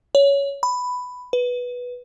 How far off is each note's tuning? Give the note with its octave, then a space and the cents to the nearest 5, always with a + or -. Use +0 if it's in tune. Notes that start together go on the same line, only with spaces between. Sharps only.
C#5 +15
B5 +10
B4 -5